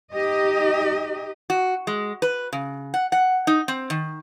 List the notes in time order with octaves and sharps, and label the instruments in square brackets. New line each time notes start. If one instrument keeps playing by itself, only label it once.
[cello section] D#4 G4 D#5
[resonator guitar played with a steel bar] F#4
G#3
B4
C#3
F#5
F#5
D#4
C4
D#3